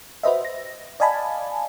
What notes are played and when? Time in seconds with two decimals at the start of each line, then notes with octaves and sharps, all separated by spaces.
0.23 F#4 B4 C5 D#5 E5
0.45 A#6
1.00 D5 D#5 F5 G#5 A5 B5